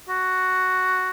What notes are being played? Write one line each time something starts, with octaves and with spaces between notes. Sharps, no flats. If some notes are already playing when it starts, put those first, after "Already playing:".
F#4